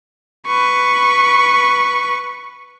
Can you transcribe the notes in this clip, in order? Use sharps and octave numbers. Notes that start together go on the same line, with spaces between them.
B4 C#6